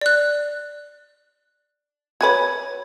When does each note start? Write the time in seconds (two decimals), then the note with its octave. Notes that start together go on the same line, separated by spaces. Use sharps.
0.01 D5 F#6
2.21 F#4 B4 C#5 G#5 G#6